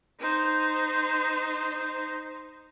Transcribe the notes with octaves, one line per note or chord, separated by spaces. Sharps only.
D#4 C5